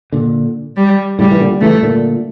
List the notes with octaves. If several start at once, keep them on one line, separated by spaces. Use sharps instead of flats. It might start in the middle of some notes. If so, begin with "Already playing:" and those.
A#2 D3
G3
A2 C#3 G3
E3
A#2 D3
C#3 E3 A3
A#2 D3